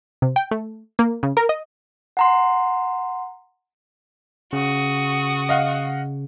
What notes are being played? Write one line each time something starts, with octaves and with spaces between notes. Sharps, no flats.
C3
G5
A3
A#3
C#3
A#4
D#5
F#5 A#5 C6
C#3 F#4 D#6
D#5 F5 F#5